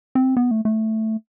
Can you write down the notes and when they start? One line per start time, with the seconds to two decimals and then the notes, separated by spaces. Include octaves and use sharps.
0.15 C4
0.37 B3
0.51 A3
0.65 A3